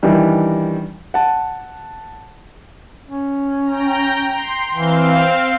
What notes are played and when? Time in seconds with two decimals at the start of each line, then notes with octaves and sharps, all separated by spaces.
0.03 D#3 E3 G3 D4
1.14 F#5 A5
3.07 C#4
3.66 G5 A#5
4.35 C6
4.74 E3 C4 F5